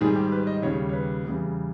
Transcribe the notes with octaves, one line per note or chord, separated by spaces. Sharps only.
G#2 D#3 G3 G#4
G4
B4
D#5
D#2 C#3 G3 C#5
C#5
B4
E2 C#3 G3